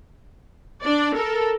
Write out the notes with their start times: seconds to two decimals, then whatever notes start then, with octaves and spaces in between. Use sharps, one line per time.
0.83 D4 D5
1.15 A4 A#4